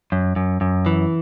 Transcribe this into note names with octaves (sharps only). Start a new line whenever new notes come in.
F#2
F#2
F#2
E3